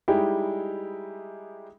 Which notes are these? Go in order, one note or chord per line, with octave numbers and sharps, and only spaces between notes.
G3 G#3 D#4 E4 G4 G#4